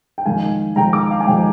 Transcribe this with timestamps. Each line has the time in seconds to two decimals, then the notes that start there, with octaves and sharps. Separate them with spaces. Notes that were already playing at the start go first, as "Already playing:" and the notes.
0.18 G5
0.25 F2 D#3 G#3 F5 G#5
0.76 F2 D#3 G#3 G5 A#5
0.93 A#5 D6
1.11 F5
1.20 G#5
1.27 F2 D#3 G#3 G5